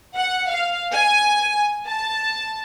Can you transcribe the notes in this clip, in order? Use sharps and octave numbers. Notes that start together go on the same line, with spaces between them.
F#5
F5
G#5
A5